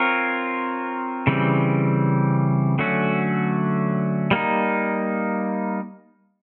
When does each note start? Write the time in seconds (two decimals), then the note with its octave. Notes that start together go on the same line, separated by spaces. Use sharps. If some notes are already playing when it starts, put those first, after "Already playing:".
Already playing: C4 F4 A#4 C#5
1.27 C#3 E3 G3 C4
2.79 D3 F#3 A3 C#4 F#4
4.31 G3 A#3 D#4